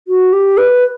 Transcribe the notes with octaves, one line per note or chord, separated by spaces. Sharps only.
F#4
G4
B4